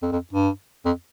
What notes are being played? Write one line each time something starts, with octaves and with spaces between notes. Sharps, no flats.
F2
F2
G2
F2